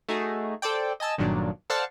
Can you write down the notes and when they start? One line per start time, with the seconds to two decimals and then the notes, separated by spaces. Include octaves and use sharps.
0.09 A3 D#4 F#4 G#4
0.62 A4 C5 D5 G5
1.00 D#5 G#5 A5 E6
1.18 G1 G2 A#2 D#3 F#3 D4
1.70 A4 C5 D5 F5 F#5 A5